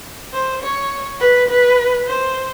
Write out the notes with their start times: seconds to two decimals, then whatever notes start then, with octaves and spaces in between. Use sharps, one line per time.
0.33 C5
0.63 C#5
1.21 B4
1.49 B4
2.07 C5